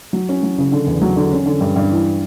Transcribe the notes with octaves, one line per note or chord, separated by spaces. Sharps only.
F#3
C#4
F#3
C#3
D3
E2
F#3
D3
C#4
D3
G2
G2
E3